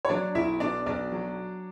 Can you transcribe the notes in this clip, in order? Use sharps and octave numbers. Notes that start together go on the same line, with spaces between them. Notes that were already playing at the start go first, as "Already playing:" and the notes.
C#5
F#3 D4 D5
B1 E4 E5
B2 D4 D5
B1 D4 D5
F#3